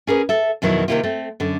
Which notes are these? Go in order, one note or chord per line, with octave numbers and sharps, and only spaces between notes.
C#4 G#4 A#4 B4
A4 E5
F2 B2 D#3 F#3 E4
C3 D#3 F3 A#3 E4 F4
A3 C4
F#2 D3